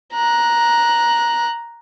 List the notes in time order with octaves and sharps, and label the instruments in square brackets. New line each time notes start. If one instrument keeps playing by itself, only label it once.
[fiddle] A#5 F#6